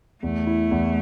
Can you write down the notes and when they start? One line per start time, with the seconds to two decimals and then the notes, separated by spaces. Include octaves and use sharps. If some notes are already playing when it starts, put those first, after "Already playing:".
0.23 E2 A3
0.47 E4
0.71 E2